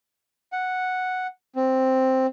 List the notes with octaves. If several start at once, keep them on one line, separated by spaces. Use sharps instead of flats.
F#5
C4